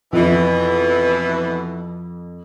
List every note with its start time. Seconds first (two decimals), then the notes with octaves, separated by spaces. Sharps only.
0.13 F2 B2 E3